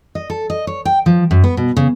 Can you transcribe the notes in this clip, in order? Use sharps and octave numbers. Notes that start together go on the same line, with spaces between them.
D#5
A4
D#5
C#5
G5
F3
F#2
B3
B2
C#3